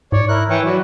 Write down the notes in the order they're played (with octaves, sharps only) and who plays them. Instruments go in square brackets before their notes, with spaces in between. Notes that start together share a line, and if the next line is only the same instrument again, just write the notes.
[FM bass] G#2 [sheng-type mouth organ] C#5 D5
[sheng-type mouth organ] E4 A#4 F#6
[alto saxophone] E3 [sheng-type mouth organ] C#5 G5 C#6
[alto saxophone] F#3 [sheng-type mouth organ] F#4 B4 D5